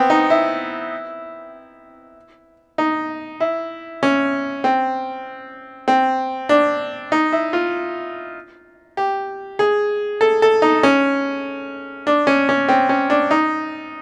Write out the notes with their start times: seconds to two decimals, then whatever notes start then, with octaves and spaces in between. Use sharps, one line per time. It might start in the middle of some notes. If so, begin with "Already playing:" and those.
Already playing: B3 C4
0.10 D#4
0.30 E4
2.78 D#4
3.40 E4
4.03 C#4
4.64 C4
5.88 C4
6.49 D4
7.12 D#4
7.32 E4
7.53 F4
8.97 G4
9.59 G#4
10.21 A4
10.42 A4
10.62 D#4
10.83 C#4
12.07 D4
12.27 C#4
12.49 C#4
12.68 C4
12.89 C#4
13.10 D4
13.31 D#4